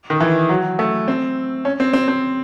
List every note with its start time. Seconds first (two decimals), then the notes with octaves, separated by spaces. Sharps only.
0.10 D#3
0.20 E3
0.49 F#3
0.79 A3
1.08 C4
1.65 C#4
1.80 C4
1.93 C4
2.08 C4